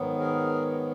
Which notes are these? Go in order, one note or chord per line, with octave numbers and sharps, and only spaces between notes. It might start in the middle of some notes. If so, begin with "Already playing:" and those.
Already playing: G#2 D#3 F#3 B3
G#4 A#4